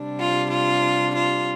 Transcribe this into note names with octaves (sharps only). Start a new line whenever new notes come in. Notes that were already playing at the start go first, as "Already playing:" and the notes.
Already playing: C3 G3 D4
F4
F4
F4